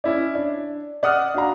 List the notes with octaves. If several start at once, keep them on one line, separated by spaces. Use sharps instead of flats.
C#4 E4 D5
D4
D5 F#5 D#6 F6
D4 F#4 F5 A#5